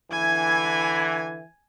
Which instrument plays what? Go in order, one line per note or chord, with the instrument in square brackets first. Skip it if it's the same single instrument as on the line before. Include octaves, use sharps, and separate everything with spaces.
[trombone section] D3 E3 [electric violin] G#5 G#6